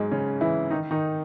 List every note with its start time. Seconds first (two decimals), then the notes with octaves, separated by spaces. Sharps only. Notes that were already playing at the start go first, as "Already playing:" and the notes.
Already playing: G#2 F#3 G#3
0.11 C#3 C#4
0.41 E3 E4
0.70 D#3 D#4
0.91 D#3 D#4